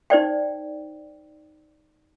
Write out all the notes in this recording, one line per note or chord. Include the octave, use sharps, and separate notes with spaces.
D#4 C5 D5 G5